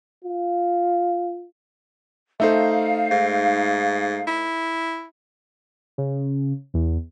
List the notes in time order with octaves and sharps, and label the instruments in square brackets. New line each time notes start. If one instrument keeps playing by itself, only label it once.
[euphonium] F4
[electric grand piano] A3 D#4 C5 [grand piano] A4 E5 [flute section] F5
[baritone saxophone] G#2
E4
[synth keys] C#3
E2